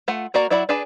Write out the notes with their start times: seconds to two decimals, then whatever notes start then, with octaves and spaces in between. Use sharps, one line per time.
0.08 A3 F4 F#5
0.34 A#3 F#4 A#4 D5 A#5
0.50 F#3 E4 D5 F#5 B5
0.69 D4 G#4 B4 D5 A5